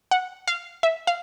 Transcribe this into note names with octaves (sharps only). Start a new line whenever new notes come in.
F#5
F5
E5
F5